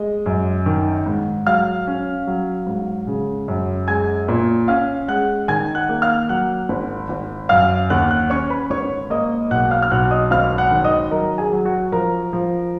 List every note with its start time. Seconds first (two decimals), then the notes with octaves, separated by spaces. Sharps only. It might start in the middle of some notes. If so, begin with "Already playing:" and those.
Already playing: G#3 D#5
0.26 F#2
0.66 D#3
1.06 G#2
1.47 F#3 F5 F6
1.87 C#4
2.27 F#3
2.67 G#2
3.07 C#3
3.48 F#2
3.87 G#3 G#5 G#6
4.28 A#2
4.68 C#4 F5 F6
5.08 G#3 F#5 F#6
5.48 D#3 G#5 G#6
5.75 F#5 F#6
5.89 A#3
6.02 F5 F6
6.29 F#3 F#5 F#6
6.69 G#1
7.09 G#1
7.49 F#2 F5 F6
7.90 D#2 F#5 F#6
8.11 F#5 F#6
8.30 C#4 C#5 C#6
8.50 B4 B5
8.70 G#1 C#5 C#6
9.10 A#3 D#5 D#6
9.51 B1 F#5 F#6
9.71 F5 F6
9.82 F6
9.91 B1 F#5 F#6
10.11 D#5 D#6
10.31 G#1 F5 F6
10.58 F#5 F#6
10.71 D#3
10.84 D#5 D#6
11.11 F#3 A#4 A#5
11.38 G#4 G#5
11.52 F#3
11.65 F#4 F#5
11.92 F3 A#4 A#5
12.33 F3